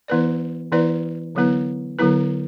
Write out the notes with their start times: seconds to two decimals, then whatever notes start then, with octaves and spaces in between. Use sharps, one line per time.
0.08 E3 B3 E4 B4 D5
0.72 E3 B3 E4 B4 D5
1.35 D3 F#3 B3 E4 B4
1.99 D3 F#3 B3 E4 B4